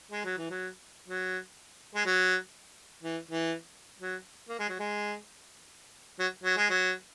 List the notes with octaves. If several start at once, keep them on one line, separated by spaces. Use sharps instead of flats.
G#3
F#3
E3
F#3
F#3
G#3
F#3
E3
E3
F#3
A#3
G#3
F#3
G#3
F#3
F#3
G#3
F#3